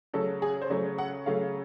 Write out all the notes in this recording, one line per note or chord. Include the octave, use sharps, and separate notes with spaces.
C#3 F#3 A3 A4
G#4
C5
C#3 F#3 A3 C#5
F#5
C#3 F#3 A3 F5